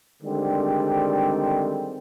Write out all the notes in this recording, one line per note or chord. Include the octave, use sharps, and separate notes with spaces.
D3 D#3 G3 G#3 C4